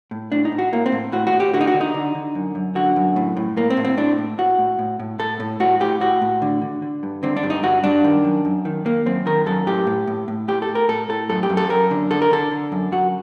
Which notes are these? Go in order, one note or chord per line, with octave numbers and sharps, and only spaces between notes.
A2
A2 D4
D#4
A2
F#4
A2 A#3
C4
A2
A2 F#4
F#4
A2
G4
D3 F#4
D#4
F#4
D3
D#4
D3
D3
F#2
F#2
D3 F#4
F#2
A2
A2
A2 A#3
C4
A2
C4
A2 D4
A2
A2 F#4
A2
A2
A2
A2 A4
A2
A2 F#4
A2 G4
A2 F#4
A2
D3
D3
D3
G2
D3 C4
D4
G2
D#4
G2 F#4
G2 D4
D#3
F#2
F#2
D#3
D#3 A#3
F#2 C4
D#3 A#4
F#2 A4
A2 G4
A2
A2
A2
A2 G4
A4
A2
A#4
A2 A4
A2 A4
F#2 A4
G4
F#2
A4
F#2 A#4
D3
D3 A4
A#4
D3 A4
D3
F#2
F#2 F#4